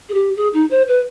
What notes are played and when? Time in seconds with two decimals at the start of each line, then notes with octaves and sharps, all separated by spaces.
0.09 G#4
0.14 G4
0.36 G#4
0.53 D#4
0.71 C5
0.88 B4